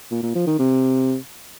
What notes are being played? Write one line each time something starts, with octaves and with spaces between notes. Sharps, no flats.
A#2
A#2
F3
D#3
C3